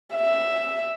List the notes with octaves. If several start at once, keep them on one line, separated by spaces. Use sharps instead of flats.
E5